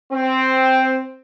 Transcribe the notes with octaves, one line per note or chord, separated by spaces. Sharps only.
C4